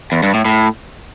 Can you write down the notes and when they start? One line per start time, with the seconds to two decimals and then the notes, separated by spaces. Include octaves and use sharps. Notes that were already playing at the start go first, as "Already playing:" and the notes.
0.12 E2
0.23 G2
0.34 A2
0.45 A2